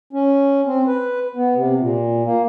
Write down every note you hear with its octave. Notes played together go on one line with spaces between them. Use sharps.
C#4
C4
B4
B3
C3
A#2
A#3